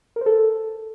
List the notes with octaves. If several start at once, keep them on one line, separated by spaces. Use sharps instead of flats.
A#4
C5
A4